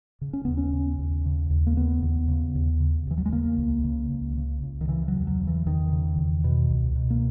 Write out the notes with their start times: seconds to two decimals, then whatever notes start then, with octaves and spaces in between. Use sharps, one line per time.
0.21 C#3
0.33 C#4
0.45 D#2 B3
0.57 C#4
0.73 C#3
0.99 D#2
1.25 C#3
1.50 D#2
1.67 A#3
1.77 C#3 B3
2.02 D#2
2.28 C#3
2.55 D#2
2.80 C#3
3.07 D#2 E3
3.18 F#3
3.26 G#3
3.32 C#3 A#3
3.58 C#2
3.84 C#3
4.10 C#2
4.37 C#3
4.63 C#2
4.81 D#3
4.88 C#3 E3
5.08 F#3
5.15 E2
5.27 F#3
5.40 C#3
5.47 E3
5.66 E2 D#3
5.92 C#3
6.18 E2
6.44 B2
6.70 C#2
6.95 B2
7.10 A#3